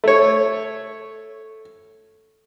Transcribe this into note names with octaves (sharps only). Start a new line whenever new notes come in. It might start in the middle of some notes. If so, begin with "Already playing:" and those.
A3 C#5